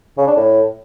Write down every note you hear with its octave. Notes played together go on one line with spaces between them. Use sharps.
C#3
D4
A2